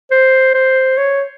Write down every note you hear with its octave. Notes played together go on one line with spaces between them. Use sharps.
C5
C5
C#5